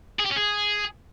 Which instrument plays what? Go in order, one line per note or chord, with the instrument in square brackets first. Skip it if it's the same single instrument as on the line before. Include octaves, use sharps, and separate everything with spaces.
[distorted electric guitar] G#4
G4
C#4
G#4